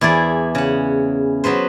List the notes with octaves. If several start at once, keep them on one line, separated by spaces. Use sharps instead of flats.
E2 E4 G#4 D5
C#3 F#5
F#3 B3 B4 C5